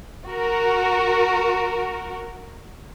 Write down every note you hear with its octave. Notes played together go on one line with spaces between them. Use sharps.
F#4 A#4